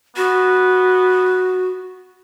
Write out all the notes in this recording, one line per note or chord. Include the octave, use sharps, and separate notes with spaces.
B3 F#4